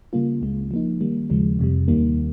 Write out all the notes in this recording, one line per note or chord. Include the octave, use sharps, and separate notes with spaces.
C#3 G3 A#3 F4
C#2 C#3 G#3
F3 A#3 D#4
D#3 G3 A#3
D#2 C#3 F3 G#3
F2 C3 G3
D#2 D#3 G3 A#3